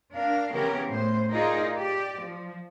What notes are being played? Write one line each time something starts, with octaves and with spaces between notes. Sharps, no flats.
D4 A#4 F5
C#3 E3 B3 C#4 G4 A#4
A2 C5
D#4 F4 G#4 A#4 D5
G4 D5
F3